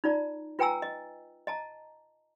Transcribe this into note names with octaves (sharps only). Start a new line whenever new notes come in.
D#4 F4 D5 A#5
F4 B4 G5 G#5 A#5 E6
D#5
D#5 A5 A#5